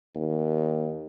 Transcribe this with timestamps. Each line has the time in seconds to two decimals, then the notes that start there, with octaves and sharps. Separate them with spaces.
0.15 D#2